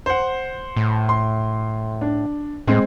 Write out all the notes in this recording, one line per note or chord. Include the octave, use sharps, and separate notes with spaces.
C5 F#5
A2
C6
D4
A2 G#3 C4